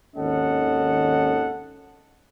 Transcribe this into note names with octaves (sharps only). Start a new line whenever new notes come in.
G#1 D#2 C#4 A4 D#5 F#5